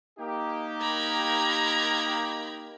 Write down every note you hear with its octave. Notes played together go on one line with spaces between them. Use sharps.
A#3 D#4 G4
A#5 B5 G#6